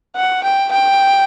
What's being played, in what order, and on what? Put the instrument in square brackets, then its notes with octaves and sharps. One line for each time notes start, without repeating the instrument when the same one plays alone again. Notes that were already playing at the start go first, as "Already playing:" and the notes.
[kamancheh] F#5
G5
G5